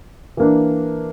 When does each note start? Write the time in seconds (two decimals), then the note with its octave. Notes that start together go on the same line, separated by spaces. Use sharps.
0.37 E3 A#3 D4